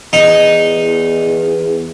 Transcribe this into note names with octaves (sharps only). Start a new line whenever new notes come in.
E2 D#4